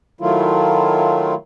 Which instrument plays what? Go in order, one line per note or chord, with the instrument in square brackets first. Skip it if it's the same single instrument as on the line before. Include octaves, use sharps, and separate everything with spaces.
[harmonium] D#3 F#3 A3 E4 F4